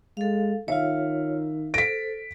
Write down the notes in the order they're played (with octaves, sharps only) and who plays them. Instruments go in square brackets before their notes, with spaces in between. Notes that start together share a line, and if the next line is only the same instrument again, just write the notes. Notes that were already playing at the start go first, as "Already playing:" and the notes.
[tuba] G#3 [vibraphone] A4 F5
[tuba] D#3 [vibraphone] F4 C#5 [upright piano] E5 F5
[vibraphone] A4 C5 [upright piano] A#6 [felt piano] B6 D7